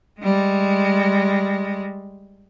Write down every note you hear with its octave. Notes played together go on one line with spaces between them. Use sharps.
G3 G#3